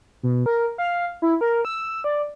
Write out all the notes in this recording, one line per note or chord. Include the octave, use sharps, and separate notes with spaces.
B2
A#4
F5
E4
A#4
E6
D5